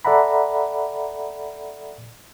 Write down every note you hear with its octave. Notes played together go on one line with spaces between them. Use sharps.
A4 D5 E5 F#5 A#5 B5